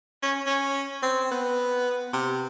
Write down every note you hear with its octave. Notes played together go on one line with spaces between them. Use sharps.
C#4
C#4
C4
B3
C3